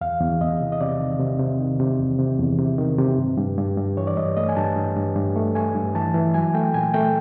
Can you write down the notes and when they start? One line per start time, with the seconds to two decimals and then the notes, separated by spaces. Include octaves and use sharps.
0.01 E2 F5
0.21 E2
0.41 E2 D#5
0.61 C3
0.72 D#5
0.81 C3 D5
1.00 D#3
1.20 C3
1.40 C3
1.60 D#3
1.80 C3
1.99 E2
2.19 C3
2.39 E2
2.59 C3
2.78 D#3
2.98 C3
3.18 G2
3.38 G2
3.57 G2
3.78 G2
3.97 E3 C#5
4.07 D5
4.17 G2 D#5
4.37 A3 D#5
4.49 G#5
4.56 G2 A5
4.76 G2
4.96 G2
5.16 G2
5.36 A3
5.55 A3 G#5
5.75 G2
5.95 E3 A5
6.14 E3
6.34 F#3 G#5
6.54 A3 G5
6.74 A#2 G#5
6.94 A3 G5